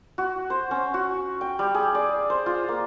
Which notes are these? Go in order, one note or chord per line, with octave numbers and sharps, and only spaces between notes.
F#4
C5
C#4
F#4
G5
G3
G#4
D5
C5
F4
A#3